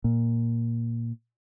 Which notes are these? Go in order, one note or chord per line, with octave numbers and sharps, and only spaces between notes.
A#2